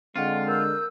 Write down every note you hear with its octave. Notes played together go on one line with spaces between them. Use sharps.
D3 G#3 C4 F4 F#5
A#4 E6 G6